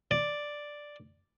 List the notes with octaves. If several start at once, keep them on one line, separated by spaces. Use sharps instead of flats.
D5